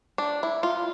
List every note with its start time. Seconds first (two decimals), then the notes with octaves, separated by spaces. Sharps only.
0.18 D4
0.43 E4
0.63 F4